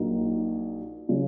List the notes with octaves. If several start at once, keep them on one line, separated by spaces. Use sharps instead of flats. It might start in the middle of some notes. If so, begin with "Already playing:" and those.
Already playing: A#1 A#2 F#3 A#3 D#4
C#3 F#3